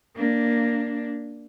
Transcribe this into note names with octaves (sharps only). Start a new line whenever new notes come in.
A#3 D4